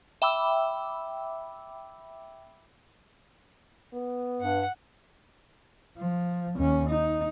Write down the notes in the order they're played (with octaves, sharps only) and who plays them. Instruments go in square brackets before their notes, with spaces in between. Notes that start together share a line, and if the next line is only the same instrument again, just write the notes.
[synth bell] E5 G5 B5 D6 E6
[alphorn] B3
[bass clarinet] G2 [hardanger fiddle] F#5
[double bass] F3
D#2 C#4
D#4